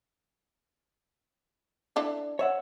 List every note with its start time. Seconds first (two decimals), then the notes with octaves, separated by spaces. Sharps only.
1.96 D4 E4 A4
2.39 C#5 E5 F#5